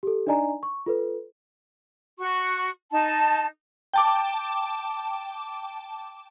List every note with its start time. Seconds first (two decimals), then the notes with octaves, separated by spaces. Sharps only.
0.03 G4 A4
0.27 D4 D#4 D5 D#5 G#5 A#5
0.63 C#6
0.86 F4 A4 B4
2.19 F#4 C#6
2.92 D#4 A5
3.94 G5 A5 D6